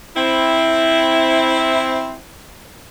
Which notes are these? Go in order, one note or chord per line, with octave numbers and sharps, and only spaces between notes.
C4 E4